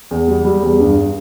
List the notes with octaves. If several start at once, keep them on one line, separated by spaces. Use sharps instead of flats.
E2
G3
G3
E2
G2